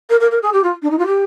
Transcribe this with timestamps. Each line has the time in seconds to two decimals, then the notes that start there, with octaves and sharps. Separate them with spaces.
0.09 A#4
0.20 A#4
0.31 A#4
0.42 G#4
0.53 G4
0.63 F4
0.82 D4
0.90 D#4
0.98 F4
1.06 G4